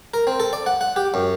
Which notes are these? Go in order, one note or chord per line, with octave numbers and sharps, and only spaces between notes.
A#4
C4
A4
D5
F#5
F#5
G4
F#2